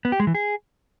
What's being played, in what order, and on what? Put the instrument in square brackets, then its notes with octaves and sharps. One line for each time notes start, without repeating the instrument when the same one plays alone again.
[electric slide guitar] B3
G4
G#3
E3
G#4